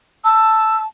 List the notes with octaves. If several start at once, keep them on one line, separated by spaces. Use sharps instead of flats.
A5 E6